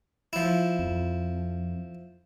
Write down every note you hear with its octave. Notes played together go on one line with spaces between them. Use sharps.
F3 E4
F2